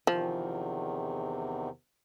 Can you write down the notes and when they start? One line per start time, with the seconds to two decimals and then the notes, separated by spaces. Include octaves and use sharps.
0.07 E2 C3 D#3 F3